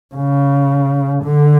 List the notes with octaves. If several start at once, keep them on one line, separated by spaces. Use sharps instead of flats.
C#3
D3